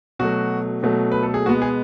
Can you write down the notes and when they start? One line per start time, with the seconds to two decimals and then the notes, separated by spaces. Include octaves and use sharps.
0.19 B2 F#3 A3 F#4
0.83 B2 F#3 A3
1.12 B4
1.23 A4
1.34 G#4
1.46 B2 G#3 B3 F#4
1.62 G#4